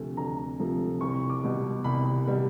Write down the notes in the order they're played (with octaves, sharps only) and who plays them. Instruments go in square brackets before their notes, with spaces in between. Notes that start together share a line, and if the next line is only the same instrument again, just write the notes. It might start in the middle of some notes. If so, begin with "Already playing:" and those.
Already playing: [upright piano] D2 C3 F3 A3
D2 A#5
C3 F3 A3
C2 C#6
D6
B2 G3
C2 B5
B2 G3